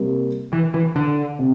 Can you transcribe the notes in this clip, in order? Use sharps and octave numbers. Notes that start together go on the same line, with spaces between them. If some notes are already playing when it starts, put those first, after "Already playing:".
Already playing: C3 G3 A#3
E3
E3
D3
C3